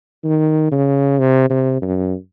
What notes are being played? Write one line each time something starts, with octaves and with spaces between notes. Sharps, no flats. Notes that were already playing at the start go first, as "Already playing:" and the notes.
D#3
C#3
C3
C3
F#2